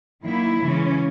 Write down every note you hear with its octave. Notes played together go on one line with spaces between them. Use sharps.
D#3 F#3 A#3 D#4 E4
C#3 E3 G#3 C#4